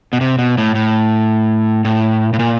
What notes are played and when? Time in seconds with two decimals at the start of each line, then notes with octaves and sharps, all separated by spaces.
0.13 B2
0.21 C3
0.39 B2
0.58 A2
0.75 A2
1.85 A2
2.33 A2
2.39 A#2